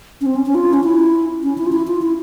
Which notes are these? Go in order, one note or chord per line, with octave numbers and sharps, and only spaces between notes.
C#4
C4
C#4
C#4
F4
C#4
E4
C#4
E4
F4
E4
F4
E4